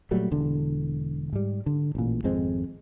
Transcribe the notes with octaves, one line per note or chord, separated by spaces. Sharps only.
A#2 F#3 G3 A3
E1 D3
G#2 G3
D3
A1 A#2
G#1 F2 G#3 C4